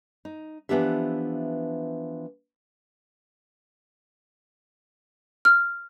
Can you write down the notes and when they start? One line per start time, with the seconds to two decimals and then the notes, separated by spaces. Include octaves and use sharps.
0.25 D#4
0.69 E3 F3 B3 D4 G4 E5
5.45 F6